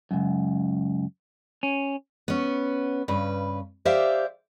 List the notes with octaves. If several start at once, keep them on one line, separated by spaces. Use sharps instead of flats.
C#2 F#2
C#4
B3 C#4
G2 C#3 B4
G4 C5 D5 E5 F5